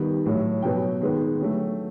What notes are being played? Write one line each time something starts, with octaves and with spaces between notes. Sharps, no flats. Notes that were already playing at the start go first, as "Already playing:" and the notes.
Already playing: D#3 G3 B3
A2 F#3 A3
B2 F#3 B3 G5
D#3 G#3 B3
D3 F#3 A3